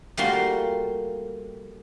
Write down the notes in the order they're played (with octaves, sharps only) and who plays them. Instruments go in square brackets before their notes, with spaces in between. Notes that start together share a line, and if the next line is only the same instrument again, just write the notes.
[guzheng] G3 A3 A#3 F4 F#4 C6